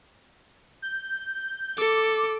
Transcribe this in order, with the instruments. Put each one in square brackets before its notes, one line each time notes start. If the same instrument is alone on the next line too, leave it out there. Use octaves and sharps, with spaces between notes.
[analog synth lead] G6
[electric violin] A4 [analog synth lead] D6